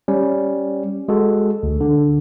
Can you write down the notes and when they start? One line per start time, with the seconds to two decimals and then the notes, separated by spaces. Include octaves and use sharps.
0.08 G3 C#4
1.08 G#3 F#4 A4
1.63 D2
1.80 D3